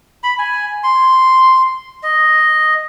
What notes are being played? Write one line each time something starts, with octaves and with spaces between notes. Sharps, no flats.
B5
G#5
C6
D#5